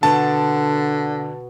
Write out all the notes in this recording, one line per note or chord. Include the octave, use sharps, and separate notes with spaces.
B2 D3 B3 C5 A5